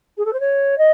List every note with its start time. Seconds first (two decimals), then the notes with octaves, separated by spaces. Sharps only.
0.17 G#4
0.25 A4
0.33 C5
0.40 C#5
0.78 D#5